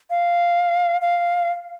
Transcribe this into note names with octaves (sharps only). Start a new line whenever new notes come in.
F5
F5